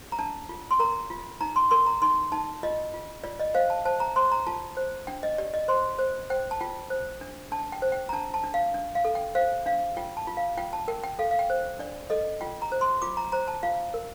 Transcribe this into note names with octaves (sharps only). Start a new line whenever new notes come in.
A#5
D4 A5
F4
C6
A#4 A#5
F4
D#4 A#5
C6
A#4 C6
A#5
D#4 C6
D#4 A5
F4 D#5
F4
F4 D5
D#5
C5 F5
A5
C5 A5
A#5
C5 C6
A#5
F4 A5
C5
D4 G5
D#5
G4 D5
D#5
C5 C6
C5
C5 G5
A5
F4 G5
C5
D4
D4 A5
G5
C5
G5
A#5
D4 A5
A5
D4
F5
D4
F5
A4
G5
C5 F5
D4 F5
F4 G5
A5
F4
F5
F4 G5
A5
A#4 G5
G5
A4 F5
F5
G5
C5
D4 D5
A4 D#5
F4 G5
A#5
C5
C6
F4 D6
A#5
C5 A#5
A5
F4 F5
A#4